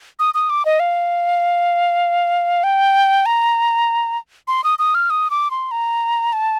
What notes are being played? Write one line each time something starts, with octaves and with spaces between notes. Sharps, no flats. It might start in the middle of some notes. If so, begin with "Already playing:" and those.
D#6
D#6
D6
D#5
F5
G5
A#5
C6
D#6
D#6
F6
D#6
D6
C6
A#5
A5